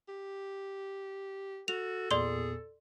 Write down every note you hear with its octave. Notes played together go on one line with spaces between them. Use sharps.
G4
F#4 A4 F7
E2 A#2 B3 G#4 D5 C6 G7